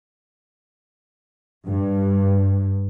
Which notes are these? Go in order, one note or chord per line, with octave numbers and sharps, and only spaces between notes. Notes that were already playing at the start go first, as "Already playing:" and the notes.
G2